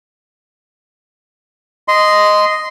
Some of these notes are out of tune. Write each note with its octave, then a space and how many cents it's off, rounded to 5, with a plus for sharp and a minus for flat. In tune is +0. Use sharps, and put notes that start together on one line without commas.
D#5 +0 C6 -15